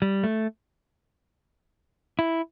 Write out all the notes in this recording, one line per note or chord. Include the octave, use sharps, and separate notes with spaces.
G3
A3
E4